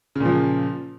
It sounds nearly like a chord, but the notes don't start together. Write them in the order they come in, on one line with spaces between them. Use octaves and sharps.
C#3 A#2 F3